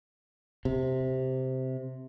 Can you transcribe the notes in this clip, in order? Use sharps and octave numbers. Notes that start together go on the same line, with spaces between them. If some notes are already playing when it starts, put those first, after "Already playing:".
C3